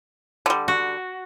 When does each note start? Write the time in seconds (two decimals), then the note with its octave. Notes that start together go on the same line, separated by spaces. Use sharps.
0.46 D3 G3
0.68 F#4